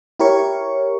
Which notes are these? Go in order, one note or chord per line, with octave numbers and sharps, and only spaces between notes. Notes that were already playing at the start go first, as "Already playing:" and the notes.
E4 G4 A#4 C#5 C#6